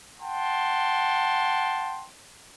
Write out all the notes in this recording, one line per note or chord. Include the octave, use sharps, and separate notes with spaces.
F#5 G5 A5 C6